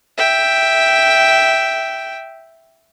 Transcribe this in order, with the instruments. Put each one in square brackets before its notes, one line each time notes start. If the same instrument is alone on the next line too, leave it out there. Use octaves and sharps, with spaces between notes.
[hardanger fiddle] E5 G5